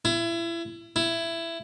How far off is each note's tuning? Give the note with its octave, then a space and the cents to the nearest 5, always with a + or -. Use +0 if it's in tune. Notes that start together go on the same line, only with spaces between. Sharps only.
E4 +30
E4 +15